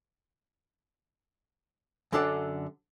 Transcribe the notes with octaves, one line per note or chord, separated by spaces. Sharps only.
F#2 D3 D4 A4 D5 F#5